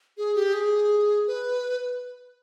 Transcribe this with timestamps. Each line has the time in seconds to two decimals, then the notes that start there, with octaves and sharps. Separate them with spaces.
0.18 G#4
0.35 G4
0.54 G#4
1.27 B4